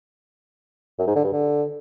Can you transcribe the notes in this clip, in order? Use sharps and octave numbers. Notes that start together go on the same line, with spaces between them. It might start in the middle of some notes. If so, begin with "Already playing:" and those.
F#2
G#2
D3
G2
D3